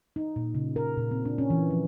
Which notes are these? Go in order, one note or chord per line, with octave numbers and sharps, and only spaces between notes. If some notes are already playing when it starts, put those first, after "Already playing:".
D#4
A#2
C#3
A#4
A#2
C4
D4
C#4
E3
F3